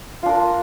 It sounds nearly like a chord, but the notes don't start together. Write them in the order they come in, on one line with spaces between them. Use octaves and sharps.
F4 D4 A#4